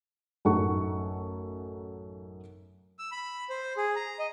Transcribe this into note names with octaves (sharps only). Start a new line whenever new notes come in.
A1 F#2 D#4 A4 F#5 C#6
E6
B5
C5
G#4
A#5
D#5